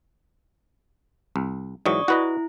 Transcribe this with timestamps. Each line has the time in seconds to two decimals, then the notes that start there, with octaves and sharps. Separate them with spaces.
1.36 C2
1.86 G#2 E3 F#3 D5 C#6 D#6
2.08 E4 F#4 B4 D#5